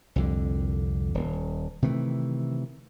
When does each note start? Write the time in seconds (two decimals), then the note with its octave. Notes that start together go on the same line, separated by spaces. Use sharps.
0.16 C2 F2 D3
1.14 D#1
1.82 C3 D#3 E3 A3